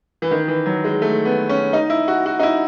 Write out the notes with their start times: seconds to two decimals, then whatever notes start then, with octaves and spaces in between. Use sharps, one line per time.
0.22 E3
0.31 D#3
0.48 E3
0.66 F#3
0.84 G#3
1.02 A3
1.25 B3
1.49 C#4
1.73 D#4
1.90 E4
2.08 F#4
2.26 F#4
2.39 D#4
2.43 E4